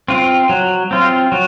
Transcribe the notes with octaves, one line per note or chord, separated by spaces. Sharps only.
C4 F4
F#3
C4 F4
F#3